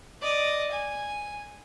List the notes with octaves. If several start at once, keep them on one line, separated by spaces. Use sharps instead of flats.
D5 D#5
G#5